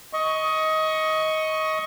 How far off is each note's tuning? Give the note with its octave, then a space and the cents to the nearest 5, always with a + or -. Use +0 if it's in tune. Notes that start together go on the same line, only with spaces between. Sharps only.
D#5 +20 C#6 +0